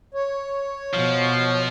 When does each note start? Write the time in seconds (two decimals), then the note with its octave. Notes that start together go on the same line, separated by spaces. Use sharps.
0.14 C#5
0.94 B2 F3